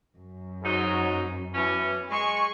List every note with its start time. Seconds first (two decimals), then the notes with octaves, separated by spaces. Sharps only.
0.16 F#2
0.63 G#2 F#3 D#4
1.53 B2 E3 C#4
2.10 G#3 G#5 C#6